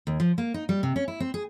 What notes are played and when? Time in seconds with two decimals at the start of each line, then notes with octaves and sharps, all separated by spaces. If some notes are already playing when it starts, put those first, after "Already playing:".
0.07 D#2
0.20 F3
0.38 A#3
0.54 D#4
0.69 G3
0.83 C3
0.96 C#4
1.08 E4
1.20 C4
1.34 G#4